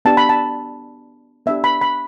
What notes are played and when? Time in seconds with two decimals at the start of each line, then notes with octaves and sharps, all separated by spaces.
0.05 B3 D4 G4 A5
0.17 B5
0.29 A5
1.46 B3 D4 G4 E5
1.64 B5
1.81 B5